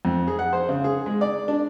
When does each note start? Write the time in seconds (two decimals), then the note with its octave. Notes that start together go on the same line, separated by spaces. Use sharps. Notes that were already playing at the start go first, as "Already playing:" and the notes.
0.05 F2
0.27 G#4
0.39 F#5
0.53 C5
0.69 C#3
0.84 G#4
1.06 G#3
1.21 D5
1.48 D4